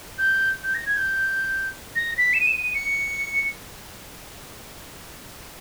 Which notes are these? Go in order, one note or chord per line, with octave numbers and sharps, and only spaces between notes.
G6
G6
A#6
G#6
G6
A#6
B6
E7
D#7
E7
D#7
D#7
C#7